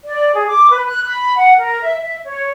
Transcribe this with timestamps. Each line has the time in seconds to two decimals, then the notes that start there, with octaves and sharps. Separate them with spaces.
0.05 D5
0.34 G#4
0.47 D6
0.71 B4
0.87 F#6
1.05 B5
1.36 F#5
1.58 A#4
1.83 E5
2.00 E5
2.26 C#5